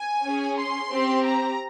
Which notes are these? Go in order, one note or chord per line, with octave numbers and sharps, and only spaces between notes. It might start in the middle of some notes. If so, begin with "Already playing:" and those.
Already playing: G#5
C#4 G#4
C6
C4 G4
A#5